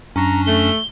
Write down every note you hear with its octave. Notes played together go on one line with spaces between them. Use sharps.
F#2 C#4 D4 A#5 C#6 A#6
A3 G7